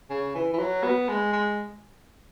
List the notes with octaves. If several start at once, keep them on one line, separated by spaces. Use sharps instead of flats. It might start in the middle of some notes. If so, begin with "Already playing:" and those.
C#3
E3
E3
F#3
B3
G#3
G#3